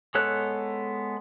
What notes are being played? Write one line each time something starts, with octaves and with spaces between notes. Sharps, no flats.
G#3 B3 A4 C#5 F#6